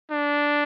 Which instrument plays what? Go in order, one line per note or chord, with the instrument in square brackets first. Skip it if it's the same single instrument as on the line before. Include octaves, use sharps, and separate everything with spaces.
[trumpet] D4